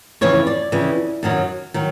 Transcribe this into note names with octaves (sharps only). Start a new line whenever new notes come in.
F2 C#3 E3 C#5
D5
F2 C#3 E3
F#2 D#3 F#3
D#3 F#3